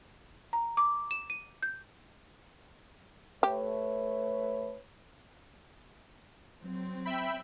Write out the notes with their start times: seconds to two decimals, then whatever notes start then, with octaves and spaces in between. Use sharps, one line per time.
0.53 A#5
0.77 D6
1.11 E7
1.30 D#7
1.62 G6
3.43 A3 G4 B4 C#5
6.63 F#3 C4
7.05 E5 G5 B5